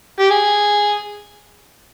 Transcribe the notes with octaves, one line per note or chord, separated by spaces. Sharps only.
G4
G#4